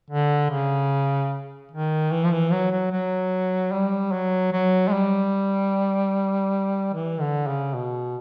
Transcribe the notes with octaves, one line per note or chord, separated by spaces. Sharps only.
D3
C#3
D#3
E3
F3
E3
F#3
F#3
F#3
G3
F#3
F#3
G#3
G3
E3
D3
C#3
B2